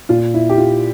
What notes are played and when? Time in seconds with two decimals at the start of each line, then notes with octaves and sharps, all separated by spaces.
0.09 A#2 F4
0.34 E4
0.49 G4
0.57 F4